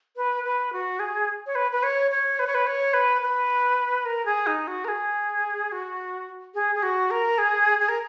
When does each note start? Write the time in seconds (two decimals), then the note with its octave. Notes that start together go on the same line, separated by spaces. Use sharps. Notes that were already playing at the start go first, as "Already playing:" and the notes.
0.17 B4
0.44 B4
0.73 F#4
1.00 G#4
1.46 C#5
1.55 B4
1.72 B4
1.83 C#5
2.11 C#5
2.39 B4
2.47 C#5
2.55 B4
2.67 C#5
2.94 B4
3.22 B4
4.05 A#4
4.26 G#4
4.47 D#4
4.68 F#4
4.85 A#4
4.88 G#4
5.72 F#4
6.55 G#4
6.75 G#4
6.83 F#4
7.11 A#4
7.38 G#4
7.80 G#4
7.89 A#4